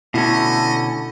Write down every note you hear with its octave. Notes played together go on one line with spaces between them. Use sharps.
B2 D3 A3 C#4 E4 D#5